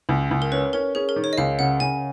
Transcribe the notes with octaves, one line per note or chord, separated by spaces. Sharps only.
C#2
C#2
A#4
C#4 B4
C#4 A#4
C#4 G#4
A#4
D#3
C#5
D#5
C#2 F5
C#3 F#5
C#3 G#5